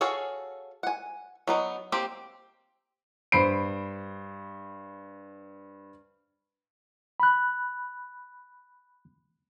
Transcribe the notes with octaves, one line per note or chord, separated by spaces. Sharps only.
F#4 G#4 A4 C#5 F5
F#5 G#5
F#3 B3 D#4
A#3 C4 G4
G2 C5 B5 C7 D7
B5 F#6